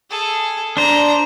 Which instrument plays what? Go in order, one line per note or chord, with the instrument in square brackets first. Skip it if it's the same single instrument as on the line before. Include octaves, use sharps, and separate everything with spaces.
[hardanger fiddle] G#4 A4
[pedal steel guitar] D4 C5 [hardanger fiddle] A#5